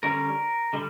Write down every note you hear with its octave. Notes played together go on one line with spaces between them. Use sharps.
D3 G3 C#4 A#4
D3 G3